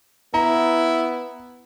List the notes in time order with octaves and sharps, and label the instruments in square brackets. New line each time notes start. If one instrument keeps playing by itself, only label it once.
[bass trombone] B3 [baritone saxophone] E4 [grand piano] A#5